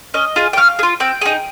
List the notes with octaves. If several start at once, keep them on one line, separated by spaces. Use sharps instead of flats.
C#4 D#5
F4 G#4
G5
C#4 F5
G#4
F4
C4 G5
D#4 G#4